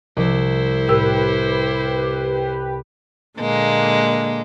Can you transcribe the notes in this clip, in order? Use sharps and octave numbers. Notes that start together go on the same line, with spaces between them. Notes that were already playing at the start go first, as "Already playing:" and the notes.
C2 C3 F3 E4 C5
A2 G4 A#4 B4 E6
A#2 D3 G#3 A#3